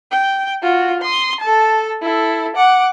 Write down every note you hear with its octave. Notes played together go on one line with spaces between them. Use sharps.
G5
F4 F#4
C6 D#6
A4 A5
E4 A4
F#5 D6